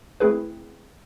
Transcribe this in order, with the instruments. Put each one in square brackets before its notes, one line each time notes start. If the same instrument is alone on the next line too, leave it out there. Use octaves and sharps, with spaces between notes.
[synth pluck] A3 C4 E4 G#4 B4